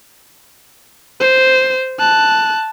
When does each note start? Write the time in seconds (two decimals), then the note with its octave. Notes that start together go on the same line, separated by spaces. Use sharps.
1.20 C5
1.99 A5 F#6